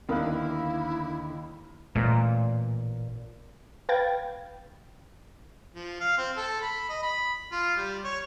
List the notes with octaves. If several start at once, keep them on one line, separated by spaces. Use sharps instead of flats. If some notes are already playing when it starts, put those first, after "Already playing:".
D#2 D3 B3 E4 A#4 F5 D#6 F#6
A1 A#2 A3 A#3
B4 F5 G5 G#6 A6
F3
F5
C4
A4
B5
D#5
B5
F4
G3
C#5